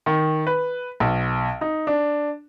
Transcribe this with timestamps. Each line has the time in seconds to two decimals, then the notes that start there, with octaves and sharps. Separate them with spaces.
0.06 D#3
0.47 B4
1.00 B1
1.61 D#4
1.87 D4